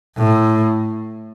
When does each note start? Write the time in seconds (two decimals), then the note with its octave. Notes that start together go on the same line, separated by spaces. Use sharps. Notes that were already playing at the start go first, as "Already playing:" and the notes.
0.18 A2